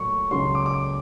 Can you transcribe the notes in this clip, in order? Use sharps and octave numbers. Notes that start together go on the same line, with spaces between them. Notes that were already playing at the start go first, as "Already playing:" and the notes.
Already playing: A#2 F#3 A3 C#6
C#2 C#3 F#3 C6
D6
D6